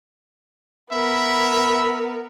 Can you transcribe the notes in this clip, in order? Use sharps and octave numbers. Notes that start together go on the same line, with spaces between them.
B3 A#4 E5 B5